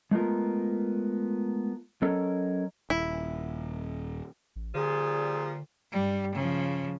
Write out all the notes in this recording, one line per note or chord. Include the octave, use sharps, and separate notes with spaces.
G#3 A3 B3 F4 A#4
F#3 C#4 A4 A#4 C#5 D#5
D#1 E4
A1
A#2 D3 F3 G3 G#4
G2 G3
C#3 F3